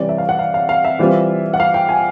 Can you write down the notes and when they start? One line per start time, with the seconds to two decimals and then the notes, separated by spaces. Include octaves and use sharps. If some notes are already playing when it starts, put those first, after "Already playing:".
Already playing: C3 E3 G3 C#5 D5
0.09 E5
0.18 F5
0.29 F#5
0.39 F5
0.54 F5
0.69 F5
0.84 E5
0.99 E3 G3 C4 F4
1.54 F#5
1.60 F5
1.74 G5
1.89 G#5